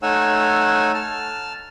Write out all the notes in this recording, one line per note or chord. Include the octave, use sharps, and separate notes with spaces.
A3 D#4 C#5 F#5 G#5 E6
A5 F6